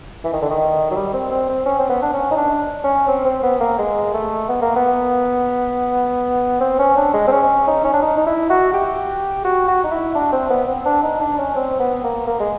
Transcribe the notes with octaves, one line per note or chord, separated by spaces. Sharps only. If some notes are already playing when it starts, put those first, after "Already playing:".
E3
D#3
D3
D#3
F#3
G3
C4
C4
C4
C#4
C4
B3
D4
C#4
D#4
D4
C#4
C4
C4
B3
A#3
G#3
A3
B3
A#3
B3
C4
C#4
D4
G#3
C4
C#4
D#4
C#4
D4
D#4
D#4
E4
F#4
G4
F#4
F#4
D#4
E4
D4
C4
B3
C4
D4
D#4
D4
C#4
C4
B3
A#3
A#3
G#3